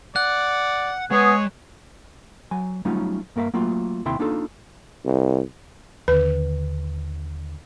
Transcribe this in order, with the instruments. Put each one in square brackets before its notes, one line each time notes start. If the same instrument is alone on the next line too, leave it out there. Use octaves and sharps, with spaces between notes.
[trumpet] D5 [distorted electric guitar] F#5 [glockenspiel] F#6
[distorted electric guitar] G#3 [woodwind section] B3 G#4 [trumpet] C#5
[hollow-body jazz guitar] F#3 G#5
F#3 G3 A3 C#4 D#4 F4
G2 A#3 A#4 E5 F5
F#3 A3 A#3 F4
D#2 C3 E4 E5 G5 C6
A#3 D4 D#4 F4 A4
[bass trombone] C2
[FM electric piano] D#2 D3 [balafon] B4